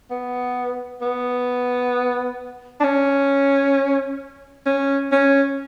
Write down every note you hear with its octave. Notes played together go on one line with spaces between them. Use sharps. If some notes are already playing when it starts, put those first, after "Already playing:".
B3
B3
D4
C#4
C#4
C#4